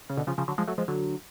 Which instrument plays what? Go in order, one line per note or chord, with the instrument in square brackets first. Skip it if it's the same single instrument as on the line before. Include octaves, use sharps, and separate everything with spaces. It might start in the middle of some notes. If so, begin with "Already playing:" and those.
[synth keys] C#3
B2 D3
C#3 F3
C#3 F3
D3 F#3
F3 G#3
F#3 A3
F3 G#3
D3 F#3